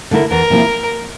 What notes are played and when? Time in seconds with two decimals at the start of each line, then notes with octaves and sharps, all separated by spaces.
0.11 D3 A3 E4 A#4
0.30 E2 A#4
0.50 C3 F3 A#3 E4